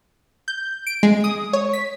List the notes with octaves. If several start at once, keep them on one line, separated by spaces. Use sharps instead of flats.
G6
D7
G#3
D#6
C#5
B6